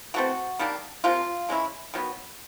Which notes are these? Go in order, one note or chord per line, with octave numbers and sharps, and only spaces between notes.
E3 A3 C4 F#4
D#3 G3 A#3 D4
C3 F3 A#3 F4
E3 G#3 C#4 E4
D#3 F#3 B3